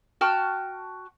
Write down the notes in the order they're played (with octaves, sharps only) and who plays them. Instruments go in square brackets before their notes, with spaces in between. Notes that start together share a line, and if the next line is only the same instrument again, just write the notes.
[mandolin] F#4 G5 A5 F6